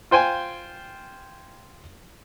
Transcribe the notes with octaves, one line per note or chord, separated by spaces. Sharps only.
F4 C5 G5 G#5